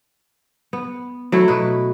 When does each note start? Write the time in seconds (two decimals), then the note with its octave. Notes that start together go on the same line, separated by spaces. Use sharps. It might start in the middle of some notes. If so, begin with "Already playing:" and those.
0.73 B3
1.32 F#3 A3 E4
1.48 B2 B4